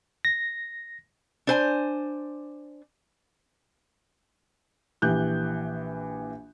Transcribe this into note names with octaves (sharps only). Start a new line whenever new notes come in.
A#6
D4 C5 G#5
A#1 E3 G4 F#6 G6